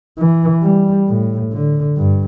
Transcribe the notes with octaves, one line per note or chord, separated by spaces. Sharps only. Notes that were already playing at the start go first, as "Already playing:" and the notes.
E3
G3
A2
D3
G2